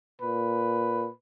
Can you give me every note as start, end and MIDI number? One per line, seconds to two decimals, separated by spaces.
0.21 1.08 46
0.21 1.12 71